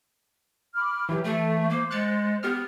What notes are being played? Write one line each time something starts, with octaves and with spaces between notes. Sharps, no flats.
B5 D6 F6
E3 F#3 G4
A3 A4 A5
A#3 C5
G#3 F#6 A6 C#7
B3 G4 F6